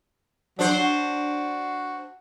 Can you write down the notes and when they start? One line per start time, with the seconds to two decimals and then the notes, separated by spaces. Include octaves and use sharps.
0.59 F#3 D4 C5
0.79 F#4